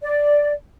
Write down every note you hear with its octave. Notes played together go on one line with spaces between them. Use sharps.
D5